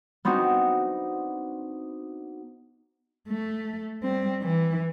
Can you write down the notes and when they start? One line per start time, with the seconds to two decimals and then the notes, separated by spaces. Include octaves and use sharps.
0.25 B3 C4 D4 D#4 F#4
3.29 A3
4.04 G3 C4
4.42 E3